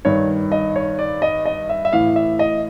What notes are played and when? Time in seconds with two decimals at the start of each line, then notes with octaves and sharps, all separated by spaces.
0.05 G2 D#3 C#5
0.52 D#5
0.76 C#5
0.99 D5
1.22 D#5
1.45 D#5
1.70 E5
1.85 E5
1.93 A2 E3 F5
2.16 E5
2.39 D#5